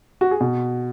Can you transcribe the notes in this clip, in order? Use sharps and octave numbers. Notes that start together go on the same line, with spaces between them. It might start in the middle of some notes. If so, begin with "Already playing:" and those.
F#4
G#4
B2